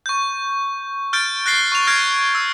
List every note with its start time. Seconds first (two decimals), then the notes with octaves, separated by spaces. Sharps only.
0.06 C#6 G6
1.13 F6 G6 A6 D7
1.46 F#6 A6 A#6 C7 G7
1.72 C#6 F7
1.87 F6 G6 G#6 A#6 C7 D7
2.35 E6